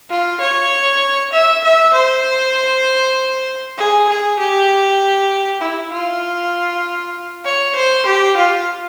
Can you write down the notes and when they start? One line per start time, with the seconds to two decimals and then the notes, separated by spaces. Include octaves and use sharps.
0.10 F4
0.40 C#5
1.33 E5
1.64 E5
1.93 C5
3.77 G#4
4.09 G#4
4.39 G4
5.61 E4
5.92 F4
7.45 C#5
7.75 C5
8.06 G4
8.37 F4